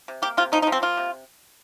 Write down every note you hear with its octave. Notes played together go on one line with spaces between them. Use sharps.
C3
A#3 G4
C3 F4
F3 D#4
D#4
F3
C4
A#3 F4
C3